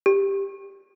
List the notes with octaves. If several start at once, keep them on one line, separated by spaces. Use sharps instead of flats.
G4